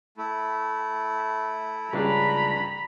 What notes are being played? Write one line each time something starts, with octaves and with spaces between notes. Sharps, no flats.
A3 E4
C#2 G2 C#3 D4 A#5 B5